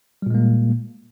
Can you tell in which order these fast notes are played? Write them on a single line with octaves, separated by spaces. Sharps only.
G3 A#2 G#3 A#3